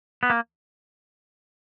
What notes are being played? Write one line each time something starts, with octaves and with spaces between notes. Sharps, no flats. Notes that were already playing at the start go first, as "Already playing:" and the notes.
B3
A#3